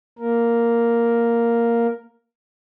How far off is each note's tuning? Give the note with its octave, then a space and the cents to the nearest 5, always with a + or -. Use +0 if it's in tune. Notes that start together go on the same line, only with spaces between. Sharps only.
A#3 +0 A#4 +0